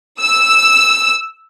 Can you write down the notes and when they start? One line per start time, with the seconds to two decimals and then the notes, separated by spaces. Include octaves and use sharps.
0.22 E6